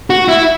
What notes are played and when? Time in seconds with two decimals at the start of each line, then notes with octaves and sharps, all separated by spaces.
0.10 F#4
0.28 E4